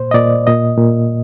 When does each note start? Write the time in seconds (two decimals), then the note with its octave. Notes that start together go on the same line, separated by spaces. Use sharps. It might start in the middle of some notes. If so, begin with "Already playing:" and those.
Already playing: A#2 C5
0.11 D#5
0.14 A#2 D5
0.47 A#2 D#5
0.78 A#2